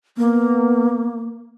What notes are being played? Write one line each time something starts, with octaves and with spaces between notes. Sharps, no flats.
A#3 B3